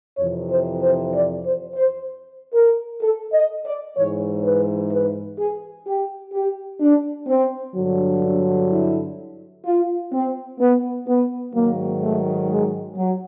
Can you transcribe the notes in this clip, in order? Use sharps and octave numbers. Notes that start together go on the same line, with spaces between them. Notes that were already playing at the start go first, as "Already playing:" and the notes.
F2 C3 E3 C#5
C5
C5
D5
C5
C5
A#4
A4
D#5
D5
G#2 E3 C#5
B4
B4
G#4
G4
G4
D4
C4
G2 D3 F#3
D4
E4
F4
C4
B3
B3
G#2 D#3 F#3 A#3
A3
G#3
F#3